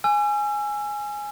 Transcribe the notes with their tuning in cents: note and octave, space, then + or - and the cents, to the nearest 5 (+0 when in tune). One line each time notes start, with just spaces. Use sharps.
G#5 +0 E6 +40